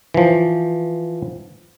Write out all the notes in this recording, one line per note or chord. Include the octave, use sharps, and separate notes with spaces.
E3 F3